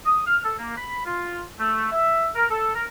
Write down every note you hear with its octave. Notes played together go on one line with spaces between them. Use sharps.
D#6
F6
A4
A#3
B5
F4
A3
E5
A#4
A4
A#4